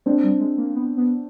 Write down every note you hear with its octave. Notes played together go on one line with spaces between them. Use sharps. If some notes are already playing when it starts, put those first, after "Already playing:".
G#3 C4 D4
G3
G#3
A#3
B3
B3